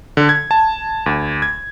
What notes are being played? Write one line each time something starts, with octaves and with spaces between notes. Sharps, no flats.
D3
G#6
A5
D2
G#6